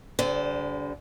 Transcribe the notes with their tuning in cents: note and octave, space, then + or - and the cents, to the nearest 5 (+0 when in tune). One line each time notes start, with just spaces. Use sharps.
D3 -35 G3 -5 C5 -35